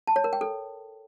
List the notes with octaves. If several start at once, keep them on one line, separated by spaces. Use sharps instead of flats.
A5
C#5
A#4
G5
A4